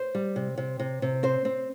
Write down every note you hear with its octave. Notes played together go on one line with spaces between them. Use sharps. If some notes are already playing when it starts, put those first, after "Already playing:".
Already playing: C5
G3
C3
C3
C3
C3
C4 C5
C4